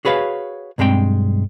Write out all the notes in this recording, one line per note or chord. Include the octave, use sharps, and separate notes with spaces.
F#4 G#4 B4 C#5 F5
B1 G2 G#3 C4 G5